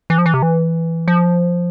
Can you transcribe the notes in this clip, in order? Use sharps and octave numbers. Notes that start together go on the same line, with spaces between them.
E3
F3
E3
C3
E3
F3